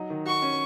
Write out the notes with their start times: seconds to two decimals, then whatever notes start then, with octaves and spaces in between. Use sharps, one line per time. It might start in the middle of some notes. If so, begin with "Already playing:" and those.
Already playing: F#3 D#4
0.10 D#3
0.26 F#4 C#6
0.42 C#4